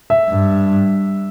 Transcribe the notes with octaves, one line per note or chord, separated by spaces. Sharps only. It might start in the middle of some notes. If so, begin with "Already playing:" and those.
E5
G2